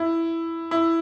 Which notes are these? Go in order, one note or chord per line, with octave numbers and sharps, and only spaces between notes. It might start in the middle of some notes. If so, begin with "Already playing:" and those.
Already playing: E4
E4